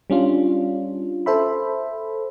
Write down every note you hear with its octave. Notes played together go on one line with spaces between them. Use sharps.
G3 C#4 D4 F4
A4 C5 E5 B5